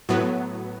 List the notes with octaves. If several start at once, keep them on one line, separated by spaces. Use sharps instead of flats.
A2 F#3 B3